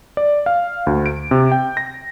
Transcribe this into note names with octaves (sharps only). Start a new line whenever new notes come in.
D5
F5
D2
D7
C3
G5
A#6